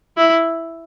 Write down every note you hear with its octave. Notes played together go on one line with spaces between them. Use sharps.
E4